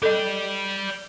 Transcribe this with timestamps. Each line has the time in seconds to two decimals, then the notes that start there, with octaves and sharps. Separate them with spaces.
0.03 A4 D5 D#5 G5